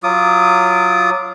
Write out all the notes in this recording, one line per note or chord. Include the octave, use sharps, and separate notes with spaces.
F#3 F4 D6 D#6